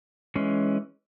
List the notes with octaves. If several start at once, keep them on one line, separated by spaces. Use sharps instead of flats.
E3 G#3 C#4